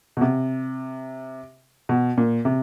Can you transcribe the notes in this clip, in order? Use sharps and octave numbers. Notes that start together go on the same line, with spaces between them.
B2
C3
B2
A#2
C3